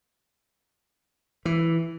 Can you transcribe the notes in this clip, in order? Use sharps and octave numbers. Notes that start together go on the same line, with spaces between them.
E3